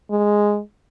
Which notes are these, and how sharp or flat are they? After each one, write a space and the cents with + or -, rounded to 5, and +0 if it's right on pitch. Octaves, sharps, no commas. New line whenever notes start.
G#3 -5